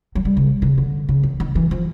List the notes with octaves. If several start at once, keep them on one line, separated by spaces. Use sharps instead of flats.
F#3
G3
C#3
C#3
D3
C#3
D#3
D#3
E3
F3